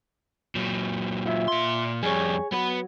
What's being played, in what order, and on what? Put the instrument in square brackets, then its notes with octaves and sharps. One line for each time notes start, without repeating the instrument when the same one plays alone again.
[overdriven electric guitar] A#2 F#3
[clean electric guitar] F4 E5
[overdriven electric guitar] A#2 C6
[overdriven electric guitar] F2 G3 [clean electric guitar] G#4 C#5
[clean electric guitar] F#3 [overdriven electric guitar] B3 B4